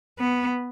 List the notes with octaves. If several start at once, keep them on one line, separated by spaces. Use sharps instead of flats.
B3